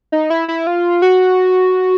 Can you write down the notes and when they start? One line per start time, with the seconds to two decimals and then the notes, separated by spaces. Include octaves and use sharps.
0.12 D#4
0.30 E4
0.48 E4
0.67 F4
1.02 F#4